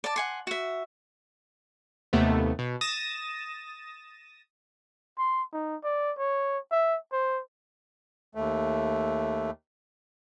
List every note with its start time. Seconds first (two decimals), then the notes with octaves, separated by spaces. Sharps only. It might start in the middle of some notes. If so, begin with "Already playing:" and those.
0.04 D5 A5
0.16 F#5 G#5 C6
0.47 F#4 E5
2.13 D#2 C3 A3 B3
2.59 B2
2.81 D#6 A6 A#6 E7
5.18 C6
5.53 D#4
5.84 D5
6.18 C#5
6.71 E5
7.12 C5
8.35 D#2 A3